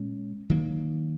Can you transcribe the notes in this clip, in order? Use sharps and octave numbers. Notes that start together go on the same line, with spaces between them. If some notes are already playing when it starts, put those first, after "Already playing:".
Already playing: A#2 G#3 C#4
D#3 F#3 A#3